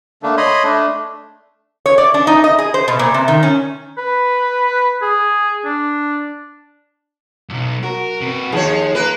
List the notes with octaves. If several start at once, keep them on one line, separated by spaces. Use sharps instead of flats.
D3 A3 A#3 D4
C#5 D#5 B5 C6 D#6
A3 D4
C#5
D5
D4
D#4
D#5
G#4
C5
B2
A#2
C3
D#3
C#4
B4
G#4
D4
B1 F2
F#4 A#4
C3 B4
D#2 F3 G#4 C#5
A#3 A#4 B4